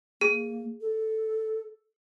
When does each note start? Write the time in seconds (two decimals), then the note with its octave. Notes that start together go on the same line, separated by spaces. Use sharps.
0.21 A#3 G#4
0.81 A4